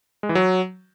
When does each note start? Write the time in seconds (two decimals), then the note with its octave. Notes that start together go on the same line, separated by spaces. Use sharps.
0.23 G#3
0.29 E3
0.35 F#3